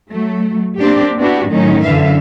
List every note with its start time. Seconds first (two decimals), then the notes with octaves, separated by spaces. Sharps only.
0.12 F#3 A3
0.78 A#3 C4 D4 G4
1.18 B3 D4 E4 F#4 G4
1.48 A2 D#3 F#3 C#4 D#4
1.86 F#2 D3 E3 E5 F5